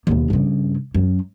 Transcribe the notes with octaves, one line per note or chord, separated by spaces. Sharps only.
D#2 B2
G2 C#3
F#2